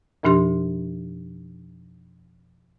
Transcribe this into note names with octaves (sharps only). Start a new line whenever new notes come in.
F2 B2 F3 D4 G4 C6